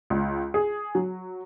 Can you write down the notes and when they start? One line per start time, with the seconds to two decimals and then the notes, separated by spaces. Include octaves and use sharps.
0.10 C#2
0.54 G#4
0.95 F#3